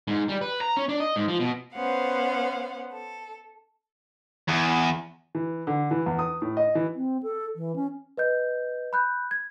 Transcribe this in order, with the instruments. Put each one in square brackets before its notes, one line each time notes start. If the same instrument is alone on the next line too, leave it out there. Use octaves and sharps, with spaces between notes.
[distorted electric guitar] G#2
G3
B4
A#5
C#4
D4
D#5
G#2
F3
B2
[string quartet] B3 C#4 C5 F5 F#5
A4
[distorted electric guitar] E2
[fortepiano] E3
D3
E3
E2
D#6
A2
D#5
E3
[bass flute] C4
A4
E3
C#4
[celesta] B4 D#5 G6
B5 F#6 G6
G#6